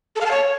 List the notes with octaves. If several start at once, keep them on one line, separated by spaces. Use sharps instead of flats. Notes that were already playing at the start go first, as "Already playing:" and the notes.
A4
F5
A5
C#5